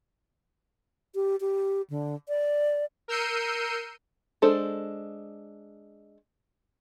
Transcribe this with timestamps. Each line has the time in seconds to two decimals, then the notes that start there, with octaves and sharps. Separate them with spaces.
1.15 G4
1.41 G4
1.90 D3
2.29 D5
3.08 A#4 E6 G6 C7 C#7 D#7
4.42 G#3 D4 A4 C5